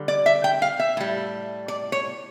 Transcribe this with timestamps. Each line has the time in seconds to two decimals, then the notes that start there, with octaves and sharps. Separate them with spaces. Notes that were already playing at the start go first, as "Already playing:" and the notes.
Already playing: D3 G3
0.08 D5
0.26 E5
0.44 G5
0.62 F5
0.79 E5
0.97 A2 G3
1.68 D5
1.92 C#5